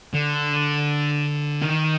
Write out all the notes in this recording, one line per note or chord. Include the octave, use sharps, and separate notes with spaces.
D3
D#3